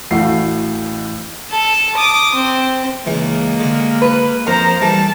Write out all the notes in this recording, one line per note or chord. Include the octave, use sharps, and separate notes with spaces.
A1 A2 A3 F#4 F5 C7
A4 A5
D6 D#6
C4
C#2 E3 G#3 A#3
D3
B4
F2 A#4 C5 A#5
E3 G3 A3 A5